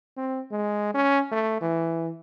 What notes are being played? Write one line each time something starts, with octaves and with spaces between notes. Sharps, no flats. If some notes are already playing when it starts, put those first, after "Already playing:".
C4
G#3
C#4
A3
E3